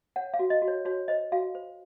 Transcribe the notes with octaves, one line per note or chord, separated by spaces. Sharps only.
C#5 F#5
F5
F#4
D#5
F#4
C#5
F#4 C#5
C5 D#5
F#4 F5
C5